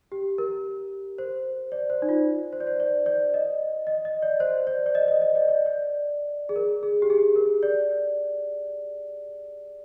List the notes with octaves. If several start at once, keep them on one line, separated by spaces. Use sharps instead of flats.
G4
A#4
C5
D5
C5
D#4
F4
C5
D5
C5
D5
D5
D#5
D#5
D#5
D5
C5
D5
D5
D#5
D#5
D#5
D5
D5
D5
G#4
A#4
G#4
G4
G#4
A#4
D5